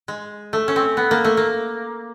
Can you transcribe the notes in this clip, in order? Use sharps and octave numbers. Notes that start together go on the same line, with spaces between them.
G#3
A3
C#4
C4
B3
A#3
A3
A#3